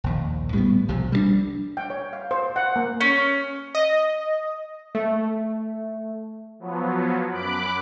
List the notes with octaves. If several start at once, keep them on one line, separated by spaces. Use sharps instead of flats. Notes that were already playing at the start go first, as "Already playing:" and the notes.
A#1 D#2
A2 G3 G#3 B3
B1 C3 F3
G3 A3 D4
G5
C#5
F5
C5
F#5
A#3
C#4
D#5
A3
F3 F#3 B3
F#2 B5 D6 F#6 D7